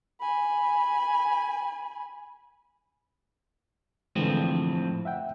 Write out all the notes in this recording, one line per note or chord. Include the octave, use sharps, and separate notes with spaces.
G#5 B5
A2 D3 E3 F3 G#3 C4
E5 F#5 G5